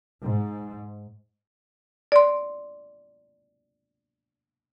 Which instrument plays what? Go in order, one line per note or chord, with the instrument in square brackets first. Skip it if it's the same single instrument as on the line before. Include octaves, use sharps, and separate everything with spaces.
[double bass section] G#2
[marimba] D5 C6